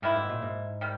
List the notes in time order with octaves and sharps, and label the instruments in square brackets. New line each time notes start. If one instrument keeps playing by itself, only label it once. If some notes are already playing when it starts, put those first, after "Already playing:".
[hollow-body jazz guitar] G#2 [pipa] D#3 A#3 E4
[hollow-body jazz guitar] G#2
A#2
G#2
[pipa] D#3 G3